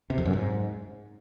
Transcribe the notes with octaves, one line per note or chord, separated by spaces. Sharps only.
C3
F2
F#2
G#2